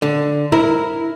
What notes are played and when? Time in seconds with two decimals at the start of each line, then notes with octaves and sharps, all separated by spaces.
0.02 D3
0.52 E4 A#4